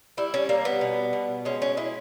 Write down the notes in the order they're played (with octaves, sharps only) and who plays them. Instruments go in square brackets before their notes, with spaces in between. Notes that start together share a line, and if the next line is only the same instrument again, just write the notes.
[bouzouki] G3 E4
C#4
G3 A#3
B3
B2
B2
G#3 C#4
C#4
G#3 E4